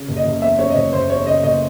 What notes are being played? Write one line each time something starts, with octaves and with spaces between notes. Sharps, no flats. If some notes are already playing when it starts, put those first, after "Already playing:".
Already playing: C#3
F#1
D#5
F#1
E2 E5
C#3 C#5
D#5
F#1 C#5
F#1 C5
E2 C#5
C#3 D#5
F#1 D#5